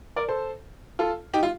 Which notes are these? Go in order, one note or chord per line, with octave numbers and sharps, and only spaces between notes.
A#4 D5
A4 C5
F4 A4
D#4 G4
F4